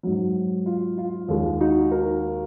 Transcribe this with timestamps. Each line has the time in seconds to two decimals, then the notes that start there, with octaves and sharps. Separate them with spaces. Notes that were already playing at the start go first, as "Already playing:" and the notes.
0.03 G#2 F#3
0.66 F4
0.98 F4
1.29 D#2 D#3 G#3
1.60 D#4 F#4
1.92 F#4 A#4